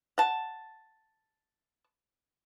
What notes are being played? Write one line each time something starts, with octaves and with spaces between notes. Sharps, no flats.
F#5 A5